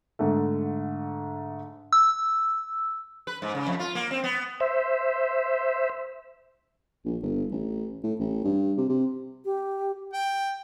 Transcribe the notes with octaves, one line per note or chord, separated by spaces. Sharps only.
G#2 D3 A3
E6
B4
G#2
C#3
F2
F4
A#3
C4
B3
C5 E5
A#1
G1
A1
A2
A1
G2
C3
C3
G4
G5